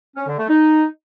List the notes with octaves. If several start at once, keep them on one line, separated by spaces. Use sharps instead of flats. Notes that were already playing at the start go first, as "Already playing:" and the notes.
C#4
D3
A3
D#4